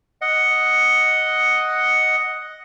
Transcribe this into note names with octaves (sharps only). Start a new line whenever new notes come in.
D#5 F#5